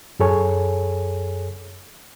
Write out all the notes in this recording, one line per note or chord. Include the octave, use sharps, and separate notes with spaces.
F#2 G#4 A4 C#5 G#5